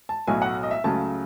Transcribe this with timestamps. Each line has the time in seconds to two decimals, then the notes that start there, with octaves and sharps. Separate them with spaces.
0.09 A5
0.27 B1 A2 F#3 A3 G#5
0.42 F#5
0.63 D#5
0.71 E5
0.84 C#2 C#3 F#3 A3 A5